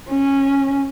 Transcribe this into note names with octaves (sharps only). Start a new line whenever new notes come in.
C#4